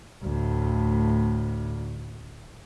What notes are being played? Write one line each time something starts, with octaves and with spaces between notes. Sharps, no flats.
D2 A2